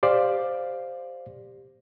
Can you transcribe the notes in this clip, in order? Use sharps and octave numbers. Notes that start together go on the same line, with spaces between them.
G4 C5 D5 F5